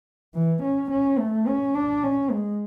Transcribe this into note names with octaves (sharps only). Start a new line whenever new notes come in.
E3
C#4
C#4
A3
C#4
D4
C#4
G#3